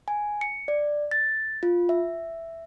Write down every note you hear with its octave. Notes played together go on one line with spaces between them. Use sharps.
G#5
C#7
D5
A6
F4
E5